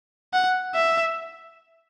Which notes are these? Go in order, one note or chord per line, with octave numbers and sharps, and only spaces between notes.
F#5
E5